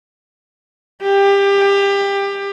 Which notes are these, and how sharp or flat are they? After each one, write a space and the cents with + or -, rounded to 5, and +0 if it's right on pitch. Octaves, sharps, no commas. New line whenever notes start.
G4 +25